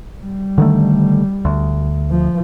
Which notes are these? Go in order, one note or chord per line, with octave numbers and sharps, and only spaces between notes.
G3
D3 D#3 A3
D2
F3